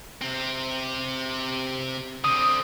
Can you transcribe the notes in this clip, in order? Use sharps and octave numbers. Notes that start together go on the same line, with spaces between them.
C3 C4
D3 C4 D#6